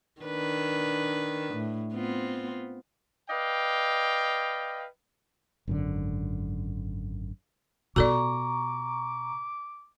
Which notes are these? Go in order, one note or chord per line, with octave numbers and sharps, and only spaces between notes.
D#3 D4 B4
A2
B3 C4 F4
B4 D5 D#5 F5 G5
G#1 F#2 D3
B2 F4 F#4 A4 D5 A#5 C#6 D6